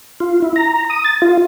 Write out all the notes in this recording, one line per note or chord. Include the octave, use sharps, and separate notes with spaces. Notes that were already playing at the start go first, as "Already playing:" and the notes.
F4
E4
A#5
D#6
A6
F4